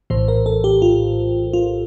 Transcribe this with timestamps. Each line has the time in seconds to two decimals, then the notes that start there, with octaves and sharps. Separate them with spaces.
0.10 A#1 A2 E3 C5
0.28 A#4
0.46 A4
0.64 G4
0.82 F4
1.53 F4